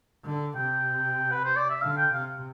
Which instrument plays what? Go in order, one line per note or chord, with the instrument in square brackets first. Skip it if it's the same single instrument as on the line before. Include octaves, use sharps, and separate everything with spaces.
[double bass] D3
[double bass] C3 [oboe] G5
[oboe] B4
C5
D5
E5
[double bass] D3 [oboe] F5
[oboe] G5
[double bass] C3 [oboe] F5